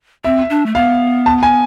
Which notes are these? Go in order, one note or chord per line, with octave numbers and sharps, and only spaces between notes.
C4 E5
D4
A3
B3 F5
A5
G#5